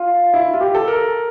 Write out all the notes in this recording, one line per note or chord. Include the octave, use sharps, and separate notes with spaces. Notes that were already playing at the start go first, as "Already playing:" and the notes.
Already playing: F4
E4
F4
G4
A4
A#4